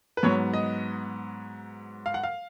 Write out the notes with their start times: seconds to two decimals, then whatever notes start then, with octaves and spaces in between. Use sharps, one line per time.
0.17 B4
0.23 G#2 F#3 B3 C#5
0.54 D#5
2.06 F5
2.14 F#5
2.23 F5